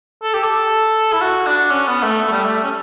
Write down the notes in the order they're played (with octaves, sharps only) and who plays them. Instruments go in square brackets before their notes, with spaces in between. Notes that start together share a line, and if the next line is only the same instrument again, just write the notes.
[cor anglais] A4
G4
A4
E4
F#4
D4
C#4
B3
A3
A3
G3
A3
C#4